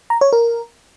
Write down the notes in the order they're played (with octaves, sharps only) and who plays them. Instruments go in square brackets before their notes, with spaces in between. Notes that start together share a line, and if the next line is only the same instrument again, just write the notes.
[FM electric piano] A#5
C#5
A#4